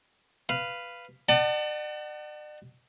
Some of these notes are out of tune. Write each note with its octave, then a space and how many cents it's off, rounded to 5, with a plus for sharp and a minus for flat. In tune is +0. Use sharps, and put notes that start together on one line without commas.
B4 +0 F5 -10
D5 +45 F#5 +30 A5 +25